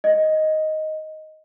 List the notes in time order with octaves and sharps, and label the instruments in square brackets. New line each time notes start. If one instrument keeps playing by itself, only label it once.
[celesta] D#5